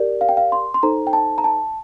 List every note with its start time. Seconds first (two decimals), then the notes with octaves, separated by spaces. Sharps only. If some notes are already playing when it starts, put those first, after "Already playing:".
Already playing: G4 A#4 D5
0.21 F5
0.29 G5
0.37 F5
0.52 C6
0.74 C6
0.83 D#4 A4 C5 A#5
1.07 G5
1.13 A5
1.38 A#5
1.44 A5